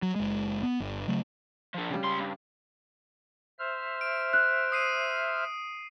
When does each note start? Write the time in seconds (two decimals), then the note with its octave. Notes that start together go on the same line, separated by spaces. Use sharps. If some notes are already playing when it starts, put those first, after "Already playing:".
0.02 F#3
0.16 F#1 G#3
0.63 B3
0.80 G1
1.08 C#3 F#3 A3
1.74 F3 D4
1.90 C#3 G3
2.04 C#2 C6
2.20 G2
3.59 C5 E5 F6
4.01 D7
4.33 F#6
4.72 D#6 C7 D#7